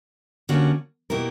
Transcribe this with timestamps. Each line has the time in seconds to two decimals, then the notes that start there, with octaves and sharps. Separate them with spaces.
0.49 D3 G3 A#3 C#4 F#4
1.10 B2 A#3 E4 G4 A#4